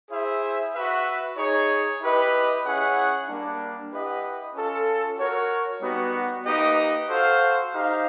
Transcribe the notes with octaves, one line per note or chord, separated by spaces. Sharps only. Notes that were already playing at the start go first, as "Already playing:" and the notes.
E4 G#4 C5 E5
F#4 B4 E5
D#4 G#4 C#5
E4 G4 B4 D#5
C#4 E4 G#4 C#5 F#5
G3 A#3 D4
E4 G4 B4 D#5 F#5
C#4 F4 A4
F#4 A#4 C#5
G3 B3 D#4 F#4
A#3 D#4 G4 B4 D#5
F#4 A4 C5 F5
D#4 G4 C5 F5